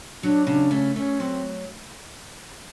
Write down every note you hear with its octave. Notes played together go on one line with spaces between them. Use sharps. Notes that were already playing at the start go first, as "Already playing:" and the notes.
F#3 D4
C#3 D4
A3 C#4
A3 C#4
F#3 C4